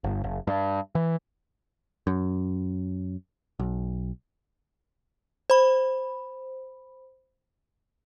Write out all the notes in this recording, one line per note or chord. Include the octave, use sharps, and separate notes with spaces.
G1
F#1
G2
E3
F#2
B1
C5 B5